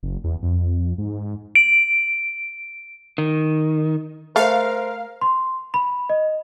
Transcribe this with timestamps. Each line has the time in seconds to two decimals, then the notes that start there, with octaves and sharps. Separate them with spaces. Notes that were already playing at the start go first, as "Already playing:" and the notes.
0.03 F#1
0.24 E2
0.43 F2
0.98 G#2
1.55 D7
3.18 D#3
4.36 A3 A#4 C5 F5 F6
5.21 C6
5.74 B5
6.09 D#5